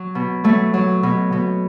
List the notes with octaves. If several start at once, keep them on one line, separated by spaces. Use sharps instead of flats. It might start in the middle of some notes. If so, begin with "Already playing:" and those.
Already playing: F#3
B2
F#3 A3
F#3
B2
B2